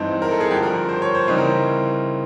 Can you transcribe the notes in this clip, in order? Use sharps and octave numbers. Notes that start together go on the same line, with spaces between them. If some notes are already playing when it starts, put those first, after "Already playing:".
Already playing: G2 E3 G#3 C4 D#4
A#4
A4
G#4
G2 D3 F3 G4
A#4
C5
C#5
C5
C#3 E3 G3 C4 D#4 B4
A#4